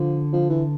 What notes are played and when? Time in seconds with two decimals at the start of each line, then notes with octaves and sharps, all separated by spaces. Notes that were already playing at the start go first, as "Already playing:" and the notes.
Already playing: D3 F3
0.33 F3
0.49 E3